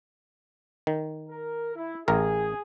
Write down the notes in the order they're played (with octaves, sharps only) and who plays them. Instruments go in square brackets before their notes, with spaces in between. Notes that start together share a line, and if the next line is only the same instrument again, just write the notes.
[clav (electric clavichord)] D#3
[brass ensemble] A#4
E4
[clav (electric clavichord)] A1 A#4 [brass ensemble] G#4